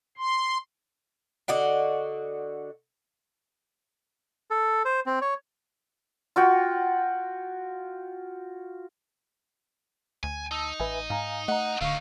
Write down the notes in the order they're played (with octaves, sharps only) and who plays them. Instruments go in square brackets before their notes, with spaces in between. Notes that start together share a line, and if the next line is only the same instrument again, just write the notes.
[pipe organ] C6
[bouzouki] D3 F#4 D5 D#5
[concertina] A4
C5
C4
C#5
[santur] F4 F#4 G5
[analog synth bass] D2 [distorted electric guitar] G#5
[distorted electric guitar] D#4 [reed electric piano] A5 E6
[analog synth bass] A1 [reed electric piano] B4 E5 G#5
[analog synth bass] G#2 [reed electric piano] F5 G#5 A#5
[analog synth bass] A3 [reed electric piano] D#5 A#5 [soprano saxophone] F#5
[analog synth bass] D1 [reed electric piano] D3 C#6 [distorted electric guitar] A3 D#4 [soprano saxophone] F5